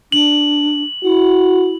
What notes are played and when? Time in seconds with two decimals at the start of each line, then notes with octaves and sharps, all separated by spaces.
0.12 D4 F#7
1.04 E4 F#4